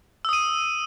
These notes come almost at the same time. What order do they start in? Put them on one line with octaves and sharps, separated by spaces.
E6 D#6 D#7